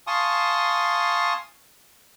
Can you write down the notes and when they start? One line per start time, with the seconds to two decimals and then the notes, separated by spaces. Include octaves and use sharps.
0.07 F5 G#5 A5 C6 C#6 D#6